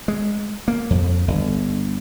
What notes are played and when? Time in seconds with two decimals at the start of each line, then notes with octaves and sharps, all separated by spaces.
0.08 G#3
0.68 A#3
0.90 F2
1.28 G1